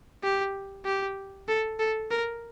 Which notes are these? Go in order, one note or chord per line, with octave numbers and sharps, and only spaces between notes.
G4
G4
A4
A4
A#4